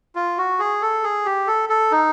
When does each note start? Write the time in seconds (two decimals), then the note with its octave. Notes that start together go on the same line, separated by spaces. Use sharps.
0.15 F4
0.38 F#4
0.59 G#4
0.82 A4
1.04 G#4
1.25 G4
1.47 A4
1.69 A4
1.92 D#4